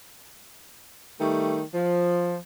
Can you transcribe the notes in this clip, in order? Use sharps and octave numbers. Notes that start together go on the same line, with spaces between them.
D#3 G3 A3
F3